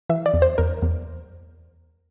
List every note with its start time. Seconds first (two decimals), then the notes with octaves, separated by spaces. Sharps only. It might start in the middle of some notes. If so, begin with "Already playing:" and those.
0.09 E3 E5
0.26 D5
0.34 E2
0.42 C5
0.58 E2 A#4
0.82 E2